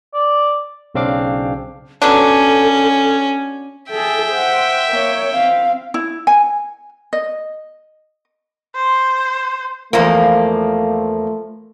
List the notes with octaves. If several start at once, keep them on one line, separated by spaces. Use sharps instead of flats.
D5
B1 C#3 C4 D4 F5 D6
F#3 B3 C#4 D4 A4
G#4 A4 E5 G5
C5 F#5
A#3 C#5
C4 F5
E4
G#5
D#5
C5
E2 F3 A3 A#3